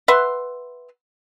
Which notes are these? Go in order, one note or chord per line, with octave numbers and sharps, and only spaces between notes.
B4 E5 F#5 C6